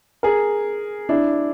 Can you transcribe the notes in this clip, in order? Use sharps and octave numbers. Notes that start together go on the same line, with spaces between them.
G#4 A#4
D4 E4